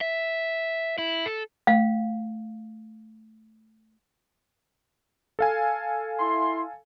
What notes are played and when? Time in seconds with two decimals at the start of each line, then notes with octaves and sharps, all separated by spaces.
0.01 E5
0.98 E4
1.26 A4
1.67 A3 F5
5.39 A4 F5 G#5
6.20 E4 C6